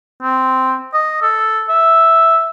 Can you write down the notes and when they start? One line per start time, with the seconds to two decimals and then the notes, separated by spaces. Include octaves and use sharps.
0.22 C4
0.94 D#5
1.22 A4
1.69 E5